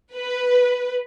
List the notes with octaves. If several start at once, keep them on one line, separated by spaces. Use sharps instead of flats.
B4